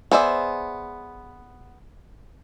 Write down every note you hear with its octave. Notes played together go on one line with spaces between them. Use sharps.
B3 G#4 C5 D5 E5